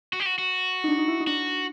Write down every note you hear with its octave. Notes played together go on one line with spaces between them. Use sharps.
F#4
G4
F#4
F#4
D#4
D4
D#4
E4
D#4
D4 F#4